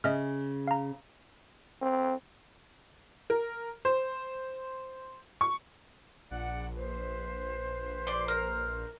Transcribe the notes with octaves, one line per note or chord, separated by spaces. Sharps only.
C#3 D#5 E5 F6
F5 A#5
C4
A#4
C5
C#6
A#1 D5 F#5
B4 C5
D5 C6
A#4